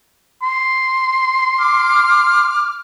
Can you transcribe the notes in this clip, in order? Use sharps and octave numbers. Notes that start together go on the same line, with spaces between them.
C6
D6 F6